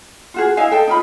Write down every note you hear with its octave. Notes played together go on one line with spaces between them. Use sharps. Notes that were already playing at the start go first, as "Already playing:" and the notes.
F4 F#4 G#4
E4 D#5 F5 G#5
A4 D#5 G5 A5
D#4 F4 B5